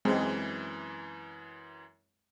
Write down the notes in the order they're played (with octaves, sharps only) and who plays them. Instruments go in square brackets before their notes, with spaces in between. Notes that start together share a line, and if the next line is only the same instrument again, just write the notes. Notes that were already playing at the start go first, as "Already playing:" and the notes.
[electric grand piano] F#2 E3 [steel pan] G#3 C4